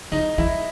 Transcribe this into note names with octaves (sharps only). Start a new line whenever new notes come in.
E3 D#4
E3 E4